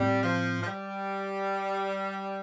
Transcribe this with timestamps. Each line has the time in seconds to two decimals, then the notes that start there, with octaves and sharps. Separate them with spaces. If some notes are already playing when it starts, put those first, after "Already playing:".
Already playing: A2 G3 A3 C4
0.23 F3
0.62 F3
0.66 G3